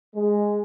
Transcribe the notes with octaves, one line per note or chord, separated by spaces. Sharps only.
G#3